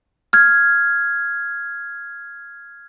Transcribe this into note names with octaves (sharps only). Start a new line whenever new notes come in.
F6 G#6